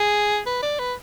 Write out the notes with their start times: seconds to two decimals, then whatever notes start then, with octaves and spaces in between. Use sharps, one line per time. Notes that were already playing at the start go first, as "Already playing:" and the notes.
Already playing: G#4
0.46 B4
0.63 D5
0.79 B4